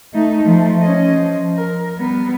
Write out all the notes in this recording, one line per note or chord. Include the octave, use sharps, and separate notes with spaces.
A3 D#4
F3 A3
C#4 D#5
F3
A#4
G3 B3